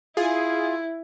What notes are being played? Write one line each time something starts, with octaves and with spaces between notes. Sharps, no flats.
E4 F4 G#4